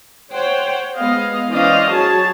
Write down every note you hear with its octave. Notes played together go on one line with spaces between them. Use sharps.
C5 C#5 F#5 G5
G#3 B3 D#5 F5
E3 C#4 C5 D5 D#5 F5
F#3 G#4 C#5 A5